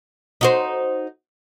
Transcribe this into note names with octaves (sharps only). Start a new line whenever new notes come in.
D#4 F#4 C5